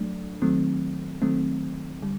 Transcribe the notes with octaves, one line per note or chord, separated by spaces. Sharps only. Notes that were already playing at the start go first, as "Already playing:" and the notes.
Already playing: F#3 A3 D4
D#3 F#3 A3 C4
D#3 F#3 A3 C4
D3 G3